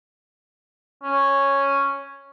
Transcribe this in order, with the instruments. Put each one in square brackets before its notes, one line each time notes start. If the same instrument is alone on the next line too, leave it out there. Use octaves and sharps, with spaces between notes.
[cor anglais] C#4